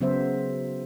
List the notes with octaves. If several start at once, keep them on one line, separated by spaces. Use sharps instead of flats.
C#3 F#3 B3 C5 E5